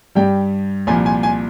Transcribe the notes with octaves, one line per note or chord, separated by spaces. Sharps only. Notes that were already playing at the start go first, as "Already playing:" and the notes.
G2 G3 G5
C2 A#2 F3 G#5
G#5
G#5